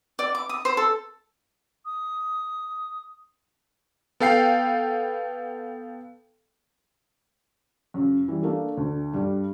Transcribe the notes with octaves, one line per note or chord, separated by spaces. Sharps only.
D5
D6
D#6
C5
A4
D#6
B3 A4 F5 G5 C7
F#2 C#3
E3 G3
A3 A#3 D4
D2
G2 G3